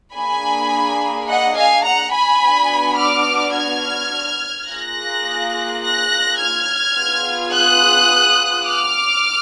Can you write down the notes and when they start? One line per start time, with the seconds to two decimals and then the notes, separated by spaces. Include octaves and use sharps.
0.14 A#3 D4 G#4 G#5 B5
1.28 D#5 F#5
1.56 F5 G#5
1.85 F#5 A#5
2.13 G#5 B5
2.41 B3 D4 F#4
2.98 D6 F6
3.55 F6 G#6
4.68 A#3 F4 G#4 F#6 A#6
5.82 F#6 A#6
6.40 F6 G#6
6.97 B3 F4 G#4
7.53 D#6 F#6
8.66 D6 F6